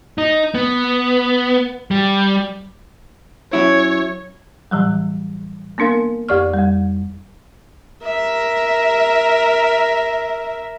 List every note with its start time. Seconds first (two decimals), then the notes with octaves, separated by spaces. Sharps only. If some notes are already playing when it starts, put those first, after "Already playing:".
0.18 D#4
0.55 B3
1.91 G3
3.53 F#3 C#4 E4 C#5
4.71 A2 E3 F#3 G3
5.78 A#3 B3 D4 A#4 F5
6.29 F2 G4 D5 C#6 F6
6.54 F2 G3
8.03 A#4 E5